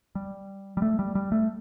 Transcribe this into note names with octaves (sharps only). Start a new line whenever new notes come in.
G3
G3
A3
G3
G3
A3